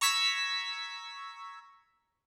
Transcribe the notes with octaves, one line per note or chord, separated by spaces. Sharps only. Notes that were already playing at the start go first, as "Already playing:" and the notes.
A#5 C#6 E6 G#6 B6